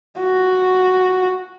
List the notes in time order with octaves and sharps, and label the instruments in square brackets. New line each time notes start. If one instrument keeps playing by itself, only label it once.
[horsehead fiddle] F#4